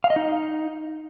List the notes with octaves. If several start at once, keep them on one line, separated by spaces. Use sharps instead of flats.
F5
D#5
D#4